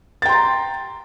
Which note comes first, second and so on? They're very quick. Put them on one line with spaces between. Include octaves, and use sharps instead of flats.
A6 G5 C6 A#5